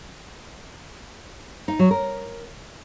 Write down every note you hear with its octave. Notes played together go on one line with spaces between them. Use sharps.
D#4
F#3
A#4